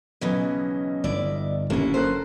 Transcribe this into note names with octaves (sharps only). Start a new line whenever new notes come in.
B1 C#3 E3 F#3 B4 D#5
G1 E4 D5
F#1 D#2 D3 A#3 C#4 E4
A4 A#4 C5 F#6